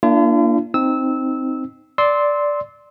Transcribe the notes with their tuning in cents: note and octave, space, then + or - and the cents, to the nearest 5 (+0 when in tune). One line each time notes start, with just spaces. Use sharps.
A#3 +0 D4 +0 F4 -45
C4 +0 D#4 +0 E6 -20
D5 -5 C6 +0 E6 -30